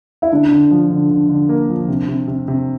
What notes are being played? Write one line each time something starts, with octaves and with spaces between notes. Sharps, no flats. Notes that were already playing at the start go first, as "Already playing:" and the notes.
E4
D3 D4
D3
F3
D3
D3
D3
A#3
F3
C3
C3
C3
C3